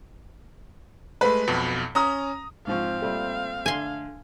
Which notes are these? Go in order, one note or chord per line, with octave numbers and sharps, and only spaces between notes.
G#3 A3 B4
B1 F2 B2
C#4 A#5 D#6
G#2 F3 C4 F5 C#6
A#2 G3 A3
D3 A3 G#5 C6